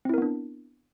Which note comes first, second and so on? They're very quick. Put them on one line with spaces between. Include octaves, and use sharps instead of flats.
C4 E4 A#4 B3 D4